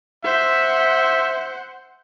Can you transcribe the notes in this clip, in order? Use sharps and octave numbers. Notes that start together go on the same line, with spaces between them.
C5 E5 F#5